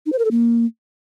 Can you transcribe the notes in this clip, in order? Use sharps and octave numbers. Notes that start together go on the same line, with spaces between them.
D#4
C5
A#4
A4
A#3